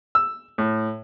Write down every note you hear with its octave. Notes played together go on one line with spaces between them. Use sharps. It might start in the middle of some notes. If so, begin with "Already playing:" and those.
E6
A2